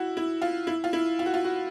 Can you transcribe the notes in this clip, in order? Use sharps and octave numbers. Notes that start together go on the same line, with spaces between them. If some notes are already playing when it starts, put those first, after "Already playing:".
Already playing: E4 F#4
E4
F4
E4
F4
E4
F4
F#4
F4
F#4